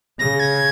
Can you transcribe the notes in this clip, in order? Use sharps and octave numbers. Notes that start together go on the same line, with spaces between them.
C#3 A#6
G#6